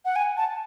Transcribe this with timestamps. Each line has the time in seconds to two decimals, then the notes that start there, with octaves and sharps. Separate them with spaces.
0.05 F#5
0.16 G#5
0.37 A5